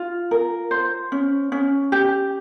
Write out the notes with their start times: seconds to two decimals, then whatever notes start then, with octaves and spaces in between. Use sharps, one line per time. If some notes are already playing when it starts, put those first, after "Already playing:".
Already playing: F4
0.31 A#4
0.71 C5
1.12 C#4
1.52 C#4
1.92 G4